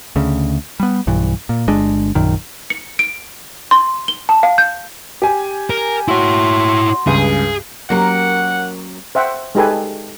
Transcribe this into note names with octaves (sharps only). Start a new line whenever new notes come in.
D2 C#3
G3 B3
B1 G2 E3
A#2
G1 G#3 D4
A#1 F#2 D#3
C#7
D7
C6
G7
A5
F5
G6
G4 G#5
A#4
E4 F#4 C#5 C6
C#2 G2 G#4
F#3 A#3 C#4 G4 A#4 F#5
C5 E5 F#5 G5
G#3 D#4 G4 A4 B4 G#5